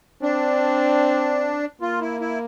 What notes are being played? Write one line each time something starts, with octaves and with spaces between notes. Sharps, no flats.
C4 D4
A#3 F4
E4
E4